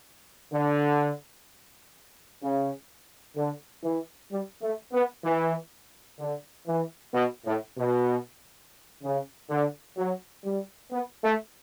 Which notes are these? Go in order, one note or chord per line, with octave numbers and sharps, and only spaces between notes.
D3
C#3
D3
E3
G3
A3
B3
E3
D3
E3
B2
A2
B2
C#3
D3
F#3
G3
B3
A3